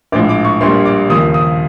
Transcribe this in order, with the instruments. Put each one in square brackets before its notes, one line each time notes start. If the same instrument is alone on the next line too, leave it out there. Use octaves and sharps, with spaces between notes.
[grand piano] A#1 A2 F3 G#3 D6
D6
C#6
A#1 A#2 G3 C6
D6
D#2 C#3 F3 A#3 D#6
D#6